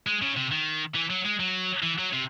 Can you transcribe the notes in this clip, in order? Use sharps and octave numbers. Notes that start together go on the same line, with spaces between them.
G#3
C#3
C3
D#3
E3
F#3
G#3
F#3
E3
F#3
C3